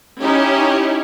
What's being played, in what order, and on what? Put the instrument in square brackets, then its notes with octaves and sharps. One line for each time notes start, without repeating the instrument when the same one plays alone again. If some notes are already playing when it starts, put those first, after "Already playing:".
[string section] C#4 D#4 E4 G4